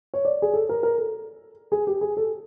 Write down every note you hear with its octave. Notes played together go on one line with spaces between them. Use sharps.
C#5
D5
G#4
A4
A#4
A#4
A4
G#4
G4
G#4
A4